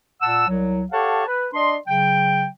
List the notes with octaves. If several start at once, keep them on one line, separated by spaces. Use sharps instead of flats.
A#2 F#5 A5 E6
C2 F#3
G4 A4 C#5 F5 F#5 A5
B4
D4 D5 D#5 C6
C#3 F#3 G5